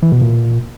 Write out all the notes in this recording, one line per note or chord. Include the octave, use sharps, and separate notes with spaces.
E3
B2
A#2